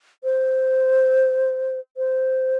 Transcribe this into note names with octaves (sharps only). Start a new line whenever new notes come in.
C5
C5